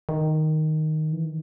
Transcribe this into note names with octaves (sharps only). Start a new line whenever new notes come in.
D#3
E3
D#3